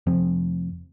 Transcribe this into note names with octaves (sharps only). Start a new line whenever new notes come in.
F1 F3 C4